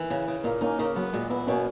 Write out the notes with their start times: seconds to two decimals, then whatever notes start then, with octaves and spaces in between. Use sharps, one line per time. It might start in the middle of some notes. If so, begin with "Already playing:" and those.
Already playing: D#3 E3
0.10 C#3
0.28 C#3
0.44 A#2 A#3
0.61 A#3 C#4 D#4
0.79 C#3 A#3
0.96 F#3 B3
1.13 A#2 G#3
1.30 B3 E4
1.47 B2 A#3 C#4